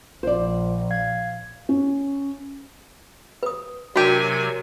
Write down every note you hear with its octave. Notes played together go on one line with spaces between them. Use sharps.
A#1 F4 C5 D5
F5 G#6
C#4
B4 D#6
C3 F#3 D4 F#4 G4 A#4 G#5